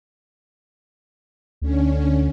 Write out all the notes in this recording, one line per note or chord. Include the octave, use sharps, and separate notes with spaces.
D2 D3 C#4